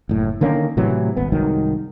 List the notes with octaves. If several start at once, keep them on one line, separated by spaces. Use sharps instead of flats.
F#1 A2
D3 D#3 A#3 C#4
A2 C3 E3 F#3
D#1 G#1 B3
C2 G#2 D#3 F#3